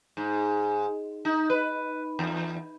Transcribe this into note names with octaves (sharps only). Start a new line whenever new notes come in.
G#2
D#4
B4
E2